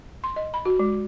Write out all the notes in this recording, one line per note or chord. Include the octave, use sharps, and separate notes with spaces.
C6
D#5
B5
F#4
G#3